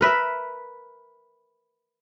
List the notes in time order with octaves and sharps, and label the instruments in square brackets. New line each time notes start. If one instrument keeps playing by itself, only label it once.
[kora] A#4 B4 E5